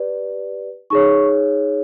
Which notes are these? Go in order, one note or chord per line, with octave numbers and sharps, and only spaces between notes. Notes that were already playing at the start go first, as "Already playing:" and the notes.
Already playing: G4 B4 D5
D#4 G#4 C#5 C#6